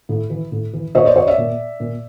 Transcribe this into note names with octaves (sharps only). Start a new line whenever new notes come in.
A2
E3
A2
E3
A#2 C#5 D#5
C5 D5
C#5 D#5
D5 E5
A#2
A#2